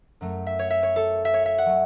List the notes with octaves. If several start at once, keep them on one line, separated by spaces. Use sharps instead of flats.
F#2 F#3 A3
E5
C#5
E5
C#5
A4
E5
C#5
E5
F#5
F#3 A3